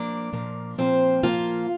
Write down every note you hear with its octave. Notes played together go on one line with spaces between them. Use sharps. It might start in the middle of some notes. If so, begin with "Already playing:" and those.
Already playing: A#2 F3 A#3 D4 D5
A#2 F3 A#3
A#2 F3 A#3 C4 C5
A#2 F3 A#3 F4 F5